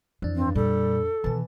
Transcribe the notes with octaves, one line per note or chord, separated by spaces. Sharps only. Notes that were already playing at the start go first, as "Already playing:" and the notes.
F2 E3 D4
G2 C4
A#2 G3 A4
B2 D#3 E3 A5